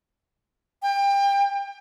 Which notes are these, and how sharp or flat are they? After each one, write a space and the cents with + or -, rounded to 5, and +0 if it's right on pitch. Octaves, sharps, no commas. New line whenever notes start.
G5 +30